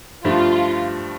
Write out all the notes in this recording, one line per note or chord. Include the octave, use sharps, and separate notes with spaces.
G2 F3 A3 D4 F4